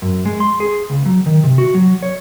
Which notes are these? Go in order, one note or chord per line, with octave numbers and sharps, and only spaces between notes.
F#2
G#3
C6
G#4
C#2
F#3
D#3
C3
F#4
F#3
C#5